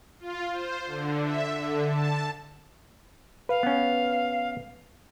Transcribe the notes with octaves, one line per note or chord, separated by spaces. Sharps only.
F4
C5
D3
E5
D3
A5
B4 F5
B3 C#4